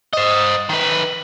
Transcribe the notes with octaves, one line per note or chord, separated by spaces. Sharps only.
C5 D#5
D#3 B4